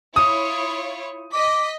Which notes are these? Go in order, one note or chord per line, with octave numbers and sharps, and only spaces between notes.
E4 F4 C#5 D#6
D#5 D6 B6